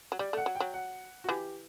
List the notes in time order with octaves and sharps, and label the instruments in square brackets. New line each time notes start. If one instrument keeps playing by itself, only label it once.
[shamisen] F#3
[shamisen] G3 [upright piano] D5
[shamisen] A3 [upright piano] F#5
[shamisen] F#3
[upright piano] G5
[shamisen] F#3
[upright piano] F#5
F#4
[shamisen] E3 [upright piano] G4